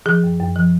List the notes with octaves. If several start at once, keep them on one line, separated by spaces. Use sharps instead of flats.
F3 G#4
F#2
F#2
F3